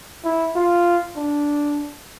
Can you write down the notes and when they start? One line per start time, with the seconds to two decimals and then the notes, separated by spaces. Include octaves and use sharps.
0.25 E4
0.56 F4
1.16 D4